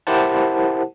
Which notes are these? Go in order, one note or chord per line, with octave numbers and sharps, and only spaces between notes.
E4 G4 A#4 C5 F#5 A5